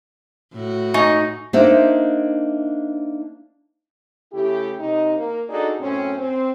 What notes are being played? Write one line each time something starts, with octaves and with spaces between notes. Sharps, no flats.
A2 F#4
D#4 G#5 C#6
A#3 D4 D#4 C5 E5
C#3 A3 E4 G4
C3 D#4
A#3
D4 D#4 F#4 G#4 A4 D5
F#2 A2 C4 C#4
C4